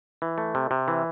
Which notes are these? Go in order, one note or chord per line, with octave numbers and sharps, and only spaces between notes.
E3
A3
C3
C3
E3